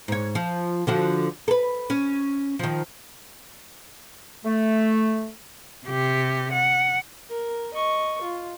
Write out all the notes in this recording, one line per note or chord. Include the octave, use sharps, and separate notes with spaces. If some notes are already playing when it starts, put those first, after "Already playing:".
G#2 C#5
F3
D3 F3 F#4
A4 B4
C#4
D#3 F3
A3
C3 G4
F#5
A#4
D#5 C#6
F4